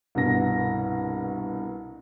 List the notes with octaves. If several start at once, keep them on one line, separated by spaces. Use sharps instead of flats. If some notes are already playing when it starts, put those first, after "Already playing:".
C2 G2 B2 A#6